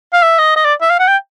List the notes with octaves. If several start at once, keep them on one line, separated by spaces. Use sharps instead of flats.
F5
E5
D#5
D#5
D5
E5
F5
F#5
G5